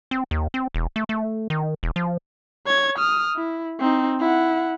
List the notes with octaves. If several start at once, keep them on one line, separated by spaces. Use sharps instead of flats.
C4
D#2
C4
E1
A3
A3
D#3
E1
F3
C#5 G#6
D#6 F6
E4
C4 D#4
E4 F#5